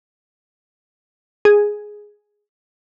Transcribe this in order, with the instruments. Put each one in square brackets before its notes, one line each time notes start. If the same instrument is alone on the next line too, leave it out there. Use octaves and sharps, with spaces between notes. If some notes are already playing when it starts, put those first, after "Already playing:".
[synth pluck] G#4